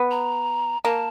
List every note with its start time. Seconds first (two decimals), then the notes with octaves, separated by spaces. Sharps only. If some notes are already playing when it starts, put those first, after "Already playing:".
Already playing: B3
0.11 A#5
0.84 A#3 A5